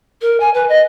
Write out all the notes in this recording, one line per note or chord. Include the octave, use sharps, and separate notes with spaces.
A#4
G#5
B4
D#5